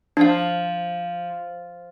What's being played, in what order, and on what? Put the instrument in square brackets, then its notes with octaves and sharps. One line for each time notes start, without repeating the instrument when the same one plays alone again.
[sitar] F3 [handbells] D4 F5